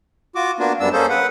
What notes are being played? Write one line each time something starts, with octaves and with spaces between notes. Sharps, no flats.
F4 F#4 D6
A#3 B3 D4 F4 F#4
F#2 G3 B3 D4 E6
A#3 C#4 G#4 A4 C5
B4 F#5